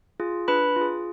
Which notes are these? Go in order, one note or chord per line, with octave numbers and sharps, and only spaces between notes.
F4 G#4
D4 B4 B5
F4 G#4